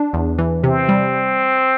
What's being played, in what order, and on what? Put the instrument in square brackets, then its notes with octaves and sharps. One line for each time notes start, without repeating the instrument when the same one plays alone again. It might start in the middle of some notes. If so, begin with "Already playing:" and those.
Already playing: [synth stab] D4
E2
E3
[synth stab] C3 [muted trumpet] C4
[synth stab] G3